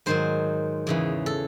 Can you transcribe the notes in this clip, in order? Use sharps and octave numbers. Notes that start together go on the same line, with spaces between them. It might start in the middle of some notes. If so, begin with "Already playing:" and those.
G#2 D#3 F#3 C5
E2 C#3 E3
A4